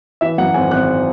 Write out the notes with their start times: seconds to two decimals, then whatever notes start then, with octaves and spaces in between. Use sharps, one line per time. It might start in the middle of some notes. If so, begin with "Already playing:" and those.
0.21 E3 E5
0.38 F#2 F#5
0.54 G#1 G#5
0.71 G#1 F#6